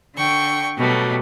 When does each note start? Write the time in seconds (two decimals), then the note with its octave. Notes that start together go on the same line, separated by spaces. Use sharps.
0.17 D3 G5 C#6
0.77 B2 F#3 G3 A3